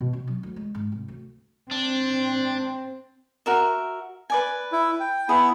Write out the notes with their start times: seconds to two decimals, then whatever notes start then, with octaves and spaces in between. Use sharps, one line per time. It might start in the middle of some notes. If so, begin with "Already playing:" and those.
0.01 B2
0.13 C#4
0.27 F#3
0.43 D2
0.56 G#3
0.75 G#2
0.92 C2
1.08 D2
1.71 C4 D4
3.46 F#4 A#4 E5
4.30 B4 D5 G#5
4.72 E4
5.00 G5
5.29 B3 E4 G#4